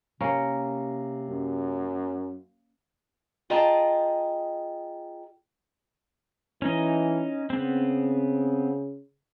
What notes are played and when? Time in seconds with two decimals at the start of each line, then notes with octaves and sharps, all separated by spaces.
0.21 C3 A#3 C#4
1.29 F#2
3.50 F4 G#4 D#5 G5 A5 A#5
6.62 E3 C#4 D#4 D#5
7.50 C#3 B3 C4